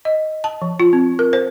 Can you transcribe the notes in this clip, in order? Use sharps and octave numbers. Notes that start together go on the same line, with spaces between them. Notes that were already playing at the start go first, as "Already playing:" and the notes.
D#5
A5
F3
F4
C4
A#4
C5